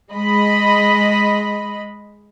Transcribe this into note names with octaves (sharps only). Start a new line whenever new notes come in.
G#3 D#5 B5